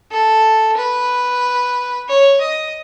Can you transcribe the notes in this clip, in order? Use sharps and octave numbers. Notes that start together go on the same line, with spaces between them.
A4
B4
C#5
D#5